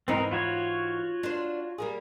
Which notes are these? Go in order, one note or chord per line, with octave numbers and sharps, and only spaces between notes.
G#2 E3 C4 D#4 A#4 B4
F4 F#4 C#5
D4 C5
G3 A#3 G#4